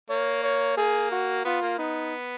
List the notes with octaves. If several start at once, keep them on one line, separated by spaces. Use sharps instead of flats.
A#3 C#5
C#5
A#3 G#4
F#4
B3 F4
A#3
B3 D#4